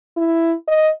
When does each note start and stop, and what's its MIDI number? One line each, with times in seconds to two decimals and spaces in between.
0.17 0.54 64
0.68 0.89 75